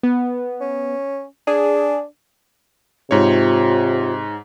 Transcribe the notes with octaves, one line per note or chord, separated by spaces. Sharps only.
B3
C#4
D4 G#4
G#2 C3 F4 C#5